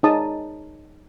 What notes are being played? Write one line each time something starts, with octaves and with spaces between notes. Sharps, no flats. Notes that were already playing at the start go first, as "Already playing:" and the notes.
D#4 G#4 C#5 A5 D#6